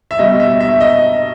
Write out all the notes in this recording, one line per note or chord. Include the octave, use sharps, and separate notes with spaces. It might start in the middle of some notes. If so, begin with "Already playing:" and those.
E5
B2 G3 D#5
E5
E5
D#5